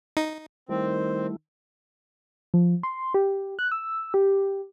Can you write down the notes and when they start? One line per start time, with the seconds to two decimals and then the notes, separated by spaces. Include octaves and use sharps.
0.17 D#4
0.69 D#3 G3 A3 C4 E4
2.54 F3
2.83 C6
3.14 G4
3.59 F#6
3.72 E6
4.14 G4